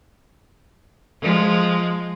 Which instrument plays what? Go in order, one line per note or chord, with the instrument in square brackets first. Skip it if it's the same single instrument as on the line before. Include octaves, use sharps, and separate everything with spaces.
[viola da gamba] F3 G#3